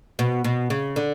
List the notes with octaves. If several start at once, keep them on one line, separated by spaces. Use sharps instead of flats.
B2
B2
C#3
D3